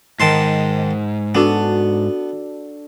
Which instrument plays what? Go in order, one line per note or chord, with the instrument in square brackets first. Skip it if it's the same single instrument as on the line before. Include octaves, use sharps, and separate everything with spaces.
[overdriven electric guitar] G#2 [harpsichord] D#3 A5 C6
[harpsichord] B3 [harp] D4 F#4 A4